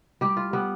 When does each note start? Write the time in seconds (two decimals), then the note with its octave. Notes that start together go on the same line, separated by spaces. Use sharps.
0.21 G3 G4
0.37 F4
0.53 G3 B3